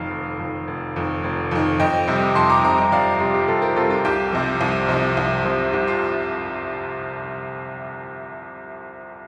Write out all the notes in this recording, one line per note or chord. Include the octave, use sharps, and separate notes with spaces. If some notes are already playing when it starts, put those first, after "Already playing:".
Already playing: F1 F2 D#3 F5
F1
F2 D#3
F1
F2 D#3
F1
F2 D#3
F2 D#5 G5
C3 G3
F2 A5 C6
A#5 D6
C3 G3 A#5 D6
D#5 G5
F2 D5 F5
C3 G3 F4
G4
F2 F4 A4
G4 A#4
C3 G3 F4 A4
F4
C2 G4
C3 F3
C2
C3 F3
C2
C3 F3
C2 G4
F4